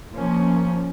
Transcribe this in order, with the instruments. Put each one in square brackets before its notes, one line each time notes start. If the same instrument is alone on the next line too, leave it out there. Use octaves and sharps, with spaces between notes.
[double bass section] F3 A#3 C#4